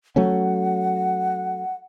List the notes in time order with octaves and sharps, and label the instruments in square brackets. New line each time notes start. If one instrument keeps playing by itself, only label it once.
[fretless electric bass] F#3 A3 C#4 [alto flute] F#5